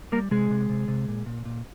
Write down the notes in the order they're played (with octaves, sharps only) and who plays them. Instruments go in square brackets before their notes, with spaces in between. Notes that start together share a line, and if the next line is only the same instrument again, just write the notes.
[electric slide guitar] G3 A#3 A#4
C3 G#3 G#4
C3
C3
C3
A#2
A#2
A#2